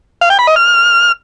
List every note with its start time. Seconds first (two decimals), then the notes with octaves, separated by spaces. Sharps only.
0.21 F5
0.30 G5
0.39 B5
0.47 D#5
0.56 F6